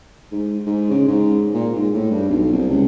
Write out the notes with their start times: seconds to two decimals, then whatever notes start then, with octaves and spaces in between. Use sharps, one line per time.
0.32 G#2
0.66 G#2
0.90 C#3
1.08 G#2
1.54 A#2
1.76 G#2
1.94 A2
2.11 G2
2.29 B1
2.52 C2
2.70 C#2